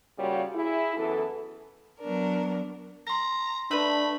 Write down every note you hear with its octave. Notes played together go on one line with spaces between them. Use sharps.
C#3 G3 A#3 F4 F#4 C#5
E4 G#4
F#2 E3 B3 A4
F#3 B3 D4 A#4
A#5 C6 A#6
A3 D4 B4 B5